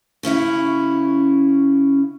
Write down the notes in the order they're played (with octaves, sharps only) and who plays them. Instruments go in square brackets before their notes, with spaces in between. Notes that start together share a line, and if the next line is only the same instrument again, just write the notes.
[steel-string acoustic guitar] C#3 C#4 E4 F#4